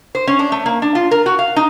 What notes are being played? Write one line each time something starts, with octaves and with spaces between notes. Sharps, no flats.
C5
C#4
D4
A3
A#3
D4
F4
A#4
F#4
F5
D#4